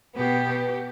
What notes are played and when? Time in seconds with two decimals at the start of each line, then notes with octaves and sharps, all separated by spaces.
0.16 B2 B3 G4